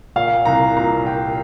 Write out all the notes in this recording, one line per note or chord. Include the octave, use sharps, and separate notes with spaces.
A#2 F5
C2 A#5
A#2 A#5
A#2 G5